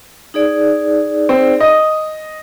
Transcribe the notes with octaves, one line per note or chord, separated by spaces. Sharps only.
D#4 G#4 D5
C4
D#5